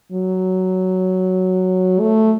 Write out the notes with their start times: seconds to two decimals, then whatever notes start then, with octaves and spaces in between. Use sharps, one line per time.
0.12 F#3
2.00 A3